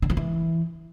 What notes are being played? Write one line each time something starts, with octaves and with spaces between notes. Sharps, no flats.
D3
F3
E3